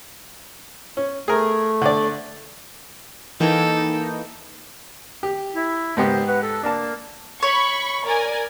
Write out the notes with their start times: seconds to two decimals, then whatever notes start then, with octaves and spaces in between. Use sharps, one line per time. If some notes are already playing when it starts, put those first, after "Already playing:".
0.97 C#4
1.28 A3 G#4 A#4
1.82 D3 D5
3.40 E3 A#3 D#4 A4 G5
5.23 G4
5.55 E4
5.97 D#2 G#2 C#3 B3 G4 C5
6.27 B4 F#5
6.43 A4
6.63 A#3 D4 A5
7.43 C#5 B5 C#6
8.06 A#4 D5 G#5